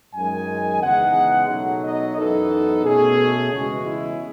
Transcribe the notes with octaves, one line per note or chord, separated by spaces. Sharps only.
F#2 D#3 G#3 G#5
E2 C#3 G#3 B3 D#4 F#5
B2 F#3 A3 D#4
D#5
F#2 E3 B3 D#4 A4
B2 A3 C#4 G#4
E2 C#3 E3 G#3 F#4
E4